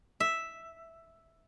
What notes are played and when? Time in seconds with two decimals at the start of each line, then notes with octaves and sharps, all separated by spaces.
0.20 E5